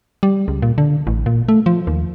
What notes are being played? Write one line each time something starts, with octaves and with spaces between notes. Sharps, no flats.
G3
C#2
A#2
D3
A1
A#2
A3
F3
D#2